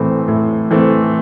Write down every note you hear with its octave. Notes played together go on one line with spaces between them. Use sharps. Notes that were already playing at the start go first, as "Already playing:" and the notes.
Already playing: A2 E3 A3 C4
A2
E3 A3 C4